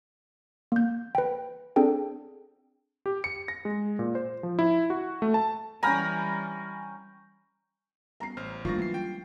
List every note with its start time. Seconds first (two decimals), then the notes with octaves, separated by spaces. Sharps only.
0.72 A#3 G6
1.15 B4 G5
1.76 C4 D4 G#4 A4 G5
3.06 G4
3.24 C#7
3.48 A#6
3.65 G#3
3.99 A#2
4.15 C5
4.43 F3
4.59 E4
4.90 F#4
5.22 A3
5.34 A5
5.83 E3 G3 C#4 G5 G#5 A#5 B5 F6
8.20 G3 B3 C#4 A#5 C7
8.37 A1 C5 F6
8.65 D#3 G3 A3 A#3 D4 F4 C#6 A#6
8.79 E3 F#3 C7
8.94 C#4 G5